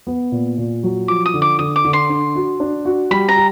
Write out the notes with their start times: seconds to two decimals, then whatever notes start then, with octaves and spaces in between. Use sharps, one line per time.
0.07 B3
0.32 A#2
0.58 A#2
0.83 F#3
1.08 F3 D6
1.26 D#6
1.34 D3
1.42 D6
1.59 D3 D#6
1.76 D6
1.85 D3
1.93 C6
2.09 D4
2.35 F#4
2.60 D4
2.85 F#4
3.11 G3 B5
3.29 A#5
3.36 G4